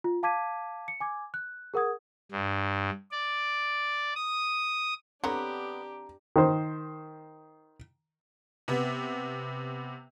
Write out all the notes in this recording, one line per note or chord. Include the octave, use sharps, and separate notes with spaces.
F4
F5 A5 D6 G#6 B6 D#7
C#7
G#5 D6 G#6
F#6
G#4 A#4 F#5 D#6 G#6
G2
D5
D#6
D3 B3 C4 D4 G4 C#5 A#5
D#3 C5
C3 B3